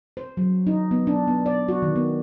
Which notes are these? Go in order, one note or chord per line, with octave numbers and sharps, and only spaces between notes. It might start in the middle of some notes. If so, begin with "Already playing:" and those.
C5
F#3
D#4
B3
D4
B3
D5
F#4
D#3
B3